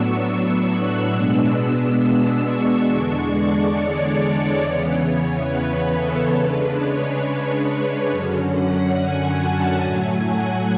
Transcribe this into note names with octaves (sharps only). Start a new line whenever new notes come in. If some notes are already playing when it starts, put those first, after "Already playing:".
Already playing: A2 F#3 B3 D4 C#6 E6
E6
F#6
B2 G#3 B3 D4 E6
E6
C#6
E2 D3 G#3 D4 C#6
D5
C#5
E2 C#3 E3 B3
B4
A4
C#3 G#3 D4 B4
C#5
F#2 D3 F#3 C#4
F#5
G#5
A5
A2 F#3 A3 G#5
F#5